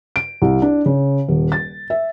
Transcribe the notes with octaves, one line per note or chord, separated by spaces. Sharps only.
D7
C2
D4
C#3
D#1
A6
E5